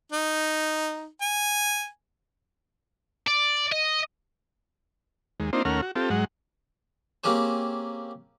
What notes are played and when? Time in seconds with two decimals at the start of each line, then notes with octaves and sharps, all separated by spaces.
0.12 D#4
1.21 G#5
3.27 D5
3.72 D#5
5.40 D#2 G#3
5.53 A#3 C4 D4 D#4 F4 C5
5.65 D#2 A3 C#4 A#4 F#5 F6
5.82 F#4
5.96 C4 F4 G4 A4
6.10 G#2 F#3 G#3 F#5
7.24 A#3 C4 C#4 G4 G#4 C5